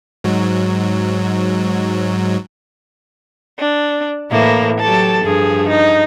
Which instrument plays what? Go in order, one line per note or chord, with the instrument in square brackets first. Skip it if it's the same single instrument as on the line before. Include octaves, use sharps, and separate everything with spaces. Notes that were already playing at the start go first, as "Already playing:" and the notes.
[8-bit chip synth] G#2 F#3
[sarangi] D4
[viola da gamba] A2 E3 E4 [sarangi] A#3
[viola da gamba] F#3 G4 A4 [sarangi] A5
[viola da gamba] G2 F3 [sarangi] G#4
[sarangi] D#4